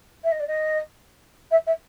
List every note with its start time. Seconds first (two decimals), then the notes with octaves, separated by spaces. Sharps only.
0.24 E5
0.31 D#5
0.40 D5
0.47 D#5
1.51 E5
1.66 E5